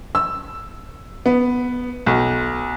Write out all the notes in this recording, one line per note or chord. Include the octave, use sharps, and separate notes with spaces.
E6
B3
B1